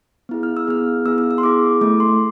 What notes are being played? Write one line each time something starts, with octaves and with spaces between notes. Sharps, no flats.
B3 E4 G#4
F6
E6
B3 E4 G#4 F6
B3 E4 G#4 E6
E6
E6
C6
B3 E4 G#4 D6
A3 E4 A4 D6
C6